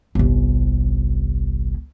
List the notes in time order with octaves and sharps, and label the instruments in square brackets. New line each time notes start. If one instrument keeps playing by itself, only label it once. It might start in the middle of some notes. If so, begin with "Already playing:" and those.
[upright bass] G1 C2